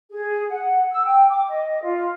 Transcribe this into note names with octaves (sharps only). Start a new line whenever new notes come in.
G#4
F#5
E6
G5
D6
D#5
F4